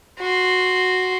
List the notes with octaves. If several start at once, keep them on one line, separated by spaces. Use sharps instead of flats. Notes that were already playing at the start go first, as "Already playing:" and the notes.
F#4 C6